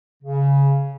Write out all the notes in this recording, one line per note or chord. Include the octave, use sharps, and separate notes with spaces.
C#3